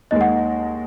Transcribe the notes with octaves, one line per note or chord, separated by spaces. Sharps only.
D#2 D#3 G#3 D#5
F#5